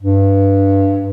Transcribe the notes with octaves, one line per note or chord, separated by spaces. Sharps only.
G2